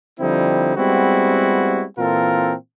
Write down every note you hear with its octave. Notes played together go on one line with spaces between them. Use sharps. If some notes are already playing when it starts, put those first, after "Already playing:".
D3 F3 G3 C4 D#4 E4
G3 G#3 B3 C4 E4 F#4
A#2 E3 C4 F4 A4 A#4